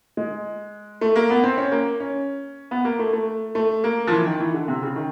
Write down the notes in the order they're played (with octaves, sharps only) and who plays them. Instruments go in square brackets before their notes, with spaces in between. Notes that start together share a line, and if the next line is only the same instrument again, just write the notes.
[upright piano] G#3
A3
A#3
B3
C4
C#4
A#3
C#4
B3
A#3
A3
A3
A3
A#3
F3
E3
D#3
E3
D3
C3
C#3
D#3